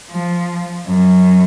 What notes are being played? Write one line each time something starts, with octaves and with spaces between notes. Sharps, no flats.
F3
F#2